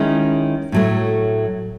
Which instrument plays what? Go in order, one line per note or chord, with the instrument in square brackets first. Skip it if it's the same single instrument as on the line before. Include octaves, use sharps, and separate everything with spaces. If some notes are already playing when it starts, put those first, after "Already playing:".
Already playing: [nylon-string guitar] D#3 G#3 C#4 E4
A2 F#3 A3